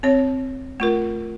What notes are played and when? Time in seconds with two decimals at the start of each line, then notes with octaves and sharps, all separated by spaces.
0.03 C4 C#5
0.80 A3 F4 A#4